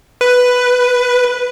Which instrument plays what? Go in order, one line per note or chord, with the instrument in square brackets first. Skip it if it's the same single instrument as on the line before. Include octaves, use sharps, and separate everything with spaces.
[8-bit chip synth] B4